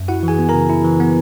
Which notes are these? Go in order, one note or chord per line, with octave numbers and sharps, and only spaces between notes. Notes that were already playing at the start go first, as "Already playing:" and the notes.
Already playing: F#2
E4 F#4 F#5
E3
G#4 G#5
B3
C#3 A#4 A#5
E4
E3
B3